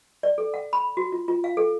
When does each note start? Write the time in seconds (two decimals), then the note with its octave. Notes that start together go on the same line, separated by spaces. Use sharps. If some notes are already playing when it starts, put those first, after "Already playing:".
0.23 D5
0.38 A4
0.54 F#5
0.73 B5
0.97 F#4
1.12 F4
1.28 F4
1.44 F5
1.57 A4